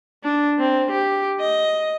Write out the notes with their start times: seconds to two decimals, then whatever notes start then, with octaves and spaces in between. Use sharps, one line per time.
0.23 D4
0.59 C4
0.91 G4
1.40 D#5